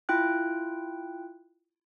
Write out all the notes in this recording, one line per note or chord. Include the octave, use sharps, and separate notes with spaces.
E4 F4 G5 F#6